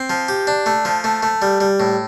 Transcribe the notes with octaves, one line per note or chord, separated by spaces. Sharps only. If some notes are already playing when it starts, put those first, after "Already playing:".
Already playing: C4
F3
G4
D4
A3
F3
A3
A3
G3
G3
A2